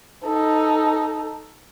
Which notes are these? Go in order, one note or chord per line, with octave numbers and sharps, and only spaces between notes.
D#4 A4